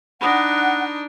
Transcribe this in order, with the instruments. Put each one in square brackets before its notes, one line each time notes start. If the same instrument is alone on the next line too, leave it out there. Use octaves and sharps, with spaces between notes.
[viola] D4 D#4 [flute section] F#5 F#6 [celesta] B5 D#6 A#6